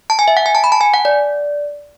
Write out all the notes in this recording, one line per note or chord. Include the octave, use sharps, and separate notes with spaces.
A5
G#5
E5
F#5
G#5
A5
B5
A5
G#5
F#5
D5